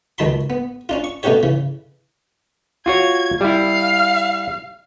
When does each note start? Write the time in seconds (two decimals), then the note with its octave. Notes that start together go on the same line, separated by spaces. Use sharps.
0.18 C#2 F#2 D#3 A5 B5 C6
0.50 B3
0.89 C#4 D4 F4
1.04 C#6
1.23 B2 A3 C#4 F#4 G4 C#5
1.43 C#3 E3
2.86 F4 F#4 C#5 G#6
3.41 G3 E4 F5